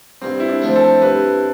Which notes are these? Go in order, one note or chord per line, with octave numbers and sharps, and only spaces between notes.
G2 C4
E4
D4
F3 A3
A4
G2 B4